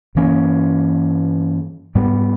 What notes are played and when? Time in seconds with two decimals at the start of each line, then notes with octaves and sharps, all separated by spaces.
0.15 G2 E3 A#3 C#4
1.95 G#2 G3 B3